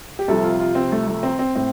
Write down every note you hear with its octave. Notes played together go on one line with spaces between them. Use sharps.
G4
C2 C3 F3 A4
F4
F4
C4
A3
A3
C4
C4
A2 C4